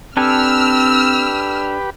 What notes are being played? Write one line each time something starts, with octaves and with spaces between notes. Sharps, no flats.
C4 D4 G4 A4 B4 G#5 E6 F6